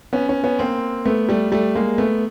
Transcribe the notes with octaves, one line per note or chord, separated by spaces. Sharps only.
B3 C#4
B3 C#4
B3 C#4
A#3 C4
A3 B3
G3 A3
G3 A3
G#3 A#3
A3 B3